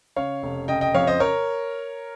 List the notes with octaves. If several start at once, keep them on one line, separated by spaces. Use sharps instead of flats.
C#3 C#5 F5
F1
C#3 D#5 G5
D#5 G5
F2 C#5 F5
C5 D#5
A#4 C#5